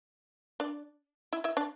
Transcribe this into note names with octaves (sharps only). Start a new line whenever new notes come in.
D4 D5
E4 E5
E4 E5
D4 D5